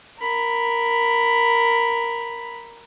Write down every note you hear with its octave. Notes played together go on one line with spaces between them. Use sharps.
A#4 B5